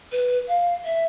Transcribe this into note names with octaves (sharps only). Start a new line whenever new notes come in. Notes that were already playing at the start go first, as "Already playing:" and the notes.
B4
F5
E5